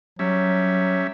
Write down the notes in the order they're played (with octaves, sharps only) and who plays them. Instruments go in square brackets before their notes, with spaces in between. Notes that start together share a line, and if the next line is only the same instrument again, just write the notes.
[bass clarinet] F#3 [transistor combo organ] G3 C#4 E5